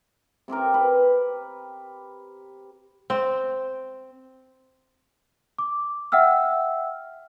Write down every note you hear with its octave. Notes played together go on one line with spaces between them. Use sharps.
C3 C4 G4 A#4
B4
C4
D6
E5 F#5 G5 E6 F6